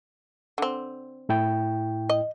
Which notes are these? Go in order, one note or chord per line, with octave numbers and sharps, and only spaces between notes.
D3 C4
A2 E4 G5
D#5